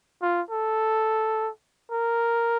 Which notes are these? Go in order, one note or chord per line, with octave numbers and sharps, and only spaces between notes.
F4
A4
A#4